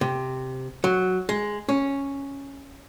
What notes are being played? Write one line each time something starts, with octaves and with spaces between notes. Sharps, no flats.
C3
F#3
G#3
C#4